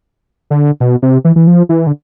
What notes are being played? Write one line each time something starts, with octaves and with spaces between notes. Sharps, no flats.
D3
B2
C3
E3
E3
F3
E3
D3